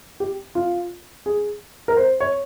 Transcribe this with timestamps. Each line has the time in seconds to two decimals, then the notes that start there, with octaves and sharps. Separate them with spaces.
0.20 G4
0.55 F4
1.26 G#4
1.88 A#4
1.97 C5
2.20 C#5